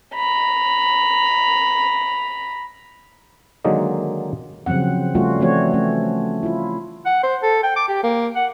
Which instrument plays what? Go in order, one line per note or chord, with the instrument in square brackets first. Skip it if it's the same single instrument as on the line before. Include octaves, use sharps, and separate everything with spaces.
[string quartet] A#5 B5
[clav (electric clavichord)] D3 D#3 F#3 G#3 A#3 D#4
[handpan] C#3 F3 F#3 C4 F#5
G3 A3 C#4 F4 F#4
E3 F3 A3 C4 F#4 C#5
A3 C#4
E4 F4
[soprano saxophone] F#5
C5
A4
G5
D6
G4
A#3
F#5